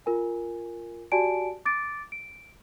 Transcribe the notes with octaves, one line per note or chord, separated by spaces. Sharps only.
F4 A#4 G#5
F#4 G4 D5 G#5 A5 D7
D6 A6 D7
D7